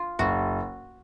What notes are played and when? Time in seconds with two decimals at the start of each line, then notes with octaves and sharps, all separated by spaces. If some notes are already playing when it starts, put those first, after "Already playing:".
Already playing: F4
0.19 F#1 F#4